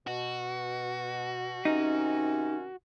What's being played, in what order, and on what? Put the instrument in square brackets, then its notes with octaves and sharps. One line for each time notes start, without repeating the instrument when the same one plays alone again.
[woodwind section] B2 [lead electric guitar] F#4
[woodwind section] C3 D#3 C#4 [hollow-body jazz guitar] D#4